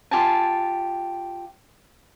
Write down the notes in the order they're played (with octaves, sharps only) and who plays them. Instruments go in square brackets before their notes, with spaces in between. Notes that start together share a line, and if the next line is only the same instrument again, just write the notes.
[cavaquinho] F4 G4 G#5 A5